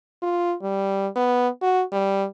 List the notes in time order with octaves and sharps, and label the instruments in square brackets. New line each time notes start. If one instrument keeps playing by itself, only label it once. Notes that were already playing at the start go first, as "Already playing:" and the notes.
[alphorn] F4
G3
B3
F#4
G3